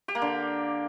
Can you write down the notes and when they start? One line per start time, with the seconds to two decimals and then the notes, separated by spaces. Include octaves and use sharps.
0.08 G4
0.15 A#3
0.22 D3